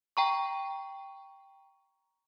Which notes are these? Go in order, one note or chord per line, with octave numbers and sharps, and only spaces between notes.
G5 A#5 C#6